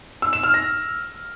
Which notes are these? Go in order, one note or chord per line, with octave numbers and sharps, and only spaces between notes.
E6
E7
F6
A#6